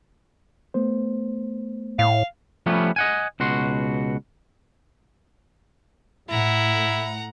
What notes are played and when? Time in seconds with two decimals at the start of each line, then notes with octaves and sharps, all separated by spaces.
0.74 A3 B3 C5
1.99 A2 F5
2.66 F3 G3 A3 B3 C#4
2.96 D#5 F#5 G#5
3.40 C#2 B2 F#4 C6
6.29 A2 E4 F#5 A#5